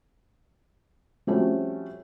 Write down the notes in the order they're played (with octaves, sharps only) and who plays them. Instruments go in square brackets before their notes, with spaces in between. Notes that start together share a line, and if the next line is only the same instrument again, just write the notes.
[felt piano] F3 G3 A3 C4 C#4 F#4